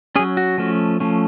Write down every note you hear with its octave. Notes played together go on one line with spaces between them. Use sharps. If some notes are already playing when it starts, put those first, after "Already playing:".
F#3 C#4 G#4
F#4
F3 A3 C#4
F3 A3 C#4